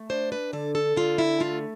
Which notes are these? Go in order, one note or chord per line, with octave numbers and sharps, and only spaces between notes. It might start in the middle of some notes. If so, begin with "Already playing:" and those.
Already playing: A3
D4 C5
B4
D3 A4
A4
D3 F4
E4
A3 F4